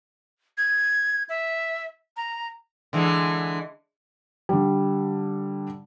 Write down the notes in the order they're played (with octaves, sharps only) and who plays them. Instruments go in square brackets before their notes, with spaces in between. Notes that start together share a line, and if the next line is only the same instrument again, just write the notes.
[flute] G#6
E5
A#5
[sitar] D3 E3 G#3
[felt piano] D3 G3